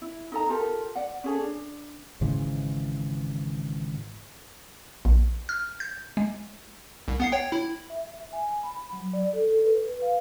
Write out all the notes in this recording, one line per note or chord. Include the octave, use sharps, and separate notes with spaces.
E4
D#4 A4 A#5
F4 G4 A4 A#4
D5 F#5
C#4 G#4 A4
D4
G#1 G#2 C#3 E3
A#1
F6
G6
G#3
C2
B3 F#5 C7
C#5 G5
E4
E5
G#5
B5
F#3
D5
A4
A4
B4
B4
F5